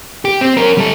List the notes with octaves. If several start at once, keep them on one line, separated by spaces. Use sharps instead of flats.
G4
C4
C#4 A#4
G3 A4